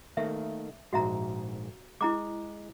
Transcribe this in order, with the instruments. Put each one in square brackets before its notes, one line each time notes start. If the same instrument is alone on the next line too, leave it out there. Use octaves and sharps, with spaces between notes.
[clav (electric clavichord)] D#3 A3 A#3 [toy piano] E5
[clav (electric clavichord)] A#1 G#2 [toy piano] F#4 E5 A#5
[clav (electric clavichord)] G#3 [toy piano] E4 A#5 D6